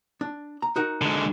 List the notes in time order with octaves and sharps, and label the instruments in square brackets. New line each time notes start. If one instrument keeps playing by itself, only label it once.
[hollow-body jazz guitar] D4
A#5
D#4 F#4 A#4
[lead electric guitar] D3 G#3